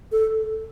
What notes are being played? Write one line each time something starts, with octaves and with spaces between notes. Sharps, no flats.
A4